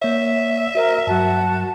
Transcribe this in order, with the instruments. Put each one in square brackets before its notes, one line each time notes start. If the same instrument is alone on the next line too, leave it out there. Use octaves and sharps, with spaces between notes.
[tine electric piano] A#3 C#5 [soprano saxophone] E5
[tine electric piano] F#4 C5 [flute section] A#4
[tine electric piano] G2 F#3 [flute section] F#4 A5